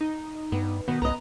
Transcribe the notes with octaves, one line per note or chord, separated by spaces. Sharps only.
D#4
G2 B3
B2 D#3 B3
C2 B4 D#5 A#5